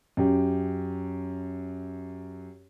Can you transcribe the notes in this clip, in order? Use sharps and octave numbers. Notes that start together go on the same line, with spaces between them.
F#2 G4